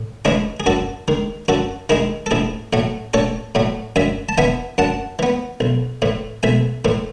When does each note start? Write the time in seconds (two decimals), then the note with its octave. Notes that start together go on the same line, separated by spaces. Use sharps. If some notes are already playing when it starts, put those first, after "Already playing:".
Already playing: A2
0.25 E3 G#3 C#4 E4 G#4
0.60 G#4
0.66 F#2 F#4 A4
1.08 D#3 G#3
1.48 F#2 F#4 A4
1.89 D#3 G#3 E4 G#4
2.26 A4
2.31 A1 E4 G#4
2.73 A2 F#3 A3
3.14 A1 A4 C#5
3.55 A2 F#3 A3
3.96 F#2 E5 G#5
4.29 A5
4.38 E3 B3 E5 G#5
4.78 F#2 F#5 A5
5.19 E3 B3
5.60 B1
6.02 A2 E3
6.43 B1 E5 G#5
6.85 A2 E3